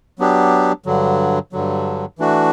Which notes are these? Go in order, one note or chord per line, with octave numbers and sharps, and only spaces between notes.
F#3 B3 D4 G4
G2 D3 F#3
G2 D3 F#3
E3 A3 D4 F#4